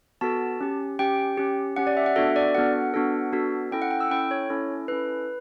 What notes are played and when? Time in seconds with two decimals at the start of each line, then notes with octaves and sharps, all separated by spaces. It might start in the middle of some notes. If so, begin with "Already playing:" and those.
0.21 B3 F#4 A4 A5
0.61 C#4 G4
0.99 C#4 G4 G5
1.37 C#4 G4
1.76 C#4 G4 F#5
1.87 D5
1.97 E5
2.06 F#5
2.16 B3 D4 F#4 A4 E5
2.36 D5
2.55 B3 D4 F#4 A4 F#5
2.94 B3 D4 F#4 A4
3.33 B3 D4 F#4 A4
3.71 C#4 E4 A4 G5
3.82 F#5
3.91 G5
4.00 E6
4.11 C#4 E4 A4 G5
4.31 C#5
4.50 C#4 E4 A4
4.88 C#4 E4 A4 B4